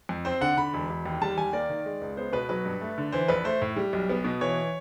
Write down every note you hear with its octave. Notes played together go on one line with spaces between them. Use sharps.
F2
C4 C5
D3 F#5
D3 B5
E1
E1
D#2
G3 A5
D#2 G#5
A#3 D5
D#3
G#3
C#2
B3 C5
B2 B4
F#3 B4
G2
A3
D3
E3 C5
A#1 B4
A3 C5
A2
G3
B1
B3
B2
E3 C#5